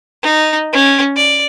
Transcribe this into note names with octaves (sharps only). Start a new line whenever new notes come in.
D#4
C#4
D5